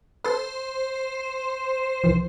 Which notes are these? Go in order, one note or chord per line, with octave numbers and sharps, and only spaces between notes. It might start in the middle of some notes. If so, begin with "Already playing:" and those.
A4 B4 C5
C2 E3 F3